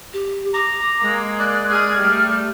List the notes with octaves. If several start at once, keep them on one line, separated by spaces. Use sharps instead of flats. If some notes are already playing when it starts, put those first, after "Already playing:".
G4
A#5 D6
G#3 A#3
D5 F#6
G#4 F6
G3 A3